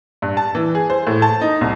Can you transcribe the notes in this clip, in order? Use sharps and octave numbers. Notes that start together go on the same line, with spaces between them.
G2
A5
E3
G#4
C5
A2
A5
D#4
C2